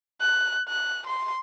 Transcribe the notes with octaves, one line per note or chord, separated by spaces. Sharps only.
F#6
F#6
C6